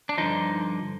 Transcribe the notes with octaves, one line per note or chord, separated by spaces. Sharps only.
D4
G2 D3 F3 D#4